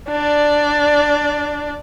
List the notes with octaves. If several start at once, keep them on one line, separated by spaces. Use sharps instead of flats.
D4 D5